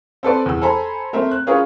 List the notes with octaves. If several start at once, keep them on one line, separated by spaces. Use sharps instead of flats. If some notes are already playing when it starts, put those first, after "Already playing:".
C4 A4 B4 D5
E2 E6
A4 C5 G#5 A#5 B5
A3 C4 A#4 C5 E5
F#6
C#4 F4 G#4 A#4 B4 C#5